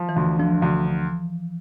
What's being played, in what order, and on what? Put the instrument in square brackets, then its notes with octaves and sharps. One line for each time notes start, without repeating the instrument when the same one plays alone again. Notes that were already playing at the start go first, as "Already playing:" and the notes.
Already playing: [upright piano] F3
[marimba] E3
[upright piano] D2
[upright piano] D3 [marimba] F3
[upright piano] D2